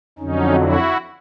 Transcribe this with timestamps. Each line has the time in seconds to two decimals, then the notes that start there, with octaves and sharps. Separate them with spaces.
0.18 F2 D3 F#3 C#4 D#4
0.60 E4 F#4